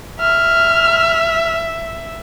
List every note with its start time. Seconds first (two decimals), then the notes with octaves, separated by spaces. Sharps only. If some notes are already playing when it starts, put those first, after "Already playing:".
0.20 E5 F6